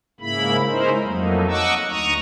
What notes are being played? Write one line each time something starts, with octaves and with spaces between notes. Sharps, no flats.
G#2 C#3 A#3 E4 B5
G#3 C#4 D#4 E4 A#4 C5
F2 F#3 A3 A#3 D#4
D#5 F#5 C#6 D6 E6
D2 A#5 C#6 D#6